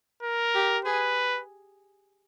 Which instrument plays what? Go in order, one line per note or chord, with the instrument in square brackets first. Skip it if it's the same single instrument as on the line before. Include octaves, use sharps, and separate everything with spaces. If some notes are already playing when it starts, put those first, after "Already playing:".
[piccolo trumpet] A#4
[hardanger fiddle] G4
[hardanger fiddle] G#4 [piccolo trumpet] B4